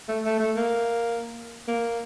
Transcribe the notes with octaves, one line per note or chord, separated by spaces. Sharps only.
A3
A3
A3
A#3
A#3